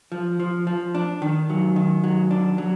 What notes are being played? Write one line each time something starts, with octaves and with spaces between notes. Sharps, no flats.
F3
F3
F3
D4
D#3
F#3
D#3
F#3
D4
F#3